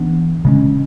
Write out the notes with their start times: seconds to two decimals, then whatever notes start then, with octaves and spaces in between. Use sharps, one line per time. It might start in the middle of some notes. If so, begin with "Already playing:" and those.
Already playing: E3 B3 D4
0.45 C#3 G#3 C#4